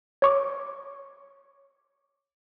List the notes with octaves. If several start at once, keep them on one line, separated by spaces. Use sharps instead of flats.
C#5 C#6 D6